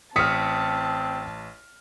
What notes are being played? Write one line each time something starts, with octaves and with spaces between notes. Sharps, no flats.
A1 C4 A5 D#6 F6 B6 C#7